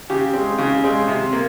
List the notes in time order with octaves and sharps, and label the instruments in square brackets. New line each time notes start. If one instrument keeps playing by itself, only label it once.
[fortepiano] C#3 G4
G#3 C4
C#3
G#3 C4
C3
A#3